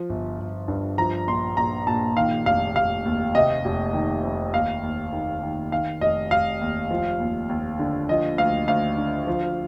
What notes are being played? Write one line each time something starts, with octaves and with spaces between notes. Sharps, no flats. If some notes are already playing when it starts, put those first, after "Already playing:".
Already playing: F3
G1
G1
G2
F3 A#5
A#1 C6
A#1 A#5
A#2 A5
D#3 F5
F1 F5
F1 F5
D#2
C3 D#5
F1
D#3
F2
D#2 F5
D#2
D#3
D#3
D#3 F5
F1 D#5
F1 F5
D#2
F3
D#2
D#2
D3
F3 D#5
D2 F5
D2 F5
D3
F3